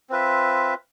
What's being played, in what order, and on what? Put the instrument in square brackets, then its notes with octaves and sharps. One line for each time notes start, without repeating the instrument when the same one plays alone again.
[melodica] C4 F4 B4 E5